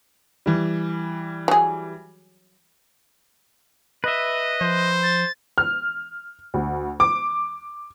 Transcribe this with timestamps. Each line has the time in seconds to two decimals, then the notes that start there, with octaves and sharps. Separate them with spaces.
0.46 E3 G3
1.48 F#3 G#4
4.04 B4 D#5 E5
4.61 F3 C5
5.03 A6
5.58 F6
6.54 D2
7.00 D6